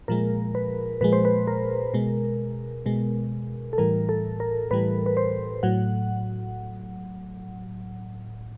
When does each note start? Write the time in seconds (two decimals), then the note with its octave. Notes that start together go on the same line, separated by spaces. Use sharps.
0.08 A#2 F3 G#3 A#4
0.55 B4
1.01 A#2 F3 G#3 B4
1.13 C5
1.25 B4
1.47 A#4
1.94 B2 G#3
2.86 B2 G#3
3.73 A4
3.78 A2 E3 G3 A#4
4.09 A4
4.40 A#4
4.71 A2 E3 G3 B4
5.06 B4
5.17 C5
5.63 A2 F#3 F#5